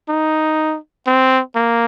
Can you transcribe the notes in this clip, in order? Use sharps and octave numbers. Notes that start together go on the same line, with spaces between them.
D#4
C4
A#3